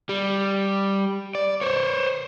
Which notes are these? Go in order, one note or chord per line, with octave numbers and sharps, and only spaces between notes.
G3
D5
C5 C#5